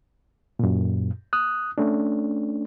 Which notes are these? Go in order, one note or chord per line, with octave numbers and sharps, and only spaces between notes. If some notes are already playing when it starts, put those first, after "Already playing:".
F#2 A#2
D#6 F#6
A3 C#4 D4